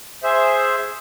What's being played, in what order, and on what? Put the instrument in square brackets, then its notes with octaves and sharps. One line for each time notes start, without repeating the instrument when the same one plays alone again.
[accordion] G#4 C5 E5